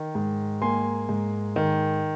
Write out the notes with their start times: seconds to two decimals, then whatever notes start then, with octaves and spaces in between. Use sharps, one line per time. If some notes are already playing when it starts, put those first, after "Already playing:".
Already playing: D#3
0.15 G#2
0.62 A#3 G#5 C6
1.09 G#2
1.56 D#3